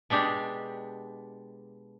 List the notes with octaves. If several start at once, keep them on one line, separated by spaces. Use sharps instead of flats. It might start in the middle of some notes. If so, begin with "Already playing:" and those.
B2 G#3 D4 G4